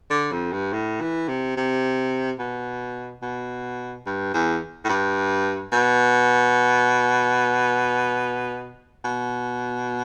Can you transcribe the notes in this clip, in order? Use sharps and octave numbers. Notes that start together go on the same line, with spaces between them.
D3
F2
G2
A2
E3
C3
C3
B2
B2
G2
E2
A2
G2
B2
B2